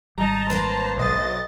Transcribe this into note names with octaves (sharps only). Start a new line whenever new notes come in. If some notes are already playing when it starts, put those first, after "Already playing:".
G#1 G3 D#4 A5 A#5
A#3 D4 B4 C5
B1 D#5 A6